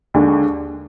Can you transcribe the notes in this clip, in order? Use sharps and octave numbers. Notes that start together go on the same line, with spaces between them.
D#2 D3 G#3 D4